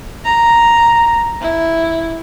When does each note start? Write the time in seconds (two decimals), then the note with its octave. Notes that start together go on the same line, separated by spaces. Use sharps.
0.25 A#5
1.41 E4